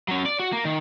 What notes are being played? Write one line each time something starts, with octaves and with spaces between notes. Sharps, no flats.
F#3 C#4
D5
F#4
A#3
D#3